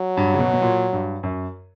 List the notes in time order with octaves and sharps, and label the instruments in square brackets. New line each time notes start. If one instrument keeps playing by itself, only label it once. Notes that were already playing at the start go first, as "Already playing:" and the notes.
Already playing: [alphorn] F#3
[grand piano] G2
C#3
B2
B2
A#2
G2
F#2